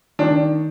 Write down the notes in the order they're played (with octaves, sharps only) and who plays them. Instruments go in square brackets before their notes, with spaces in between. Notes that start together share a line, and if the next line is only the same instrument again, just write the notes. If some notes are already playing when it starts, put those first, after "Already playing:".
[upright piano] D#3 D4